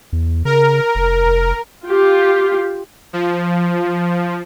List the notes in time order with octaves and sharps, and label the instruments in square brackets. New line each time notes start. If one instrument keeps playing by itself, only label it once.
[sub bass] E2
[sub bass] C#3 [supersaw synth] A#4
[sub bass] F1
F1
[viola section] F4 G4
[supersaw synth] F3